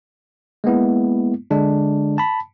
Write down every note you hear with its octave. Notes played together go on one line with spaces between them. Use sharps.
G#3 A#3 B3 E4
D3 G#3 D4
A5 B5